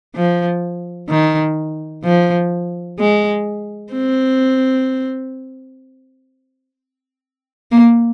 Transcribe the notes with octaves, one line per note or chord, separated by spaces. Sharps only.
F3
D#3
F3
G#3
C4
A#3